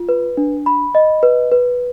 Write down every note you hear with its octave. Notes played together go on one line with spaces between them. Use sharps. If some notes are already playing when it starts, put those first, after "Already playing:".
Already playing: F4
B4
D4
B5
D#5
B4
B4